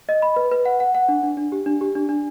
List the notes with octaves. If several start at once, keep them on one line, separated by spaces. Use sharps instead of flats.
D#5
B5
B4
B4
F#5
F#5
F#5
D4
D4
D4
G4
D4
G4
D4
D4